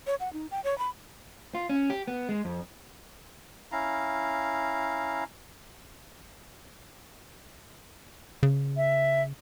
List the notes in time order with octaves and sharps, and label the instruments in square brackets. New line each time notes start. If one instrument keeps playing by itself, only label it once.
[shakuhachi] C#5
F#5
D#4
G5
C#5
B5
[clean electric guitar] F4
C#4
G4
B3
G#3
F2
[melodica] C#4 E4 F5 A#5
[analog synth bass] C#3
[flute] E5